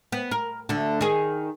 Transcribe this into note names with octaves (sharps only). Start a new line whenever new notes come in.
B3
A#4
D2 D3
D#3 G#4